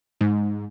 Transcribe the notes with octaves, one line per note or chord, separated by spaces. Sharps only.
G#2